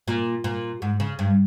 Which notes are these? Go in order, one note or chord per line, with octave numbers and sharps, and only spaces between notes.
A#2
A#2
G#2
C#3
G2